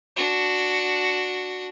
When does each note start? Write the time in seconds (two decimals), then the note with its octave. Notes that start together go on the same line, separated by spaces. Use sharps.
0.16 D4 F#4